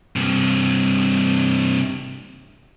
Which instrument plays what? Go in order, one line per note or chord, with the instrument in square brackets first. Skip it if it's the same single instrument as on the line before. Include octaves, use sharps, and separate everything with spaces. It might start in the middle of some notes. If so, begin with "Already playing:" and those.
[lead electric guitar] G2 C3